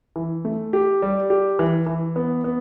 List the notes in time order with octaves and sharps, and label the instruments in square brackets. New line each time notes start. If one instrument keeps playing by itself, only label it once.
[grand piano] E3
A3
G4
G3
G4
E3
E3
B3
B3